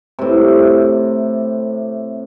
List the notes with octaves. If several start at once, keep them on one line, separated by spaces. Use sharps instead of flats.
A2 C3